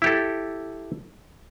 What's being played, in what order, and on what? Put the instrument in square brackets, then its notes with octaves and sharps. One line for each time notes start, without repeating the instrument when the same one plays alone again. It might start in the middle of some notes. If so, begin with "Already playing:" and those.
[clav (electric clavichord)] E4 G4 A4